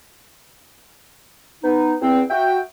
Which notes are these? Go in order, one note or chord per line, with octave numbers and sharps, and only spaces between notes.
B3 D#4
E2 C4
F#4 E5 G5